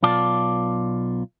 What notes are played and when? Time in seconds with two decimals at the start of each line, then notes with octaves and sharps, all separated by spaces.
0.03 B1 B2 F4 D5 A5